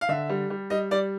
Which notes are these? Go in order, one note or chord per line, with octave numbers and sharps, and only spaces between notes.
F5
D3 E5
G3
G3
G3 D#5
G3 D5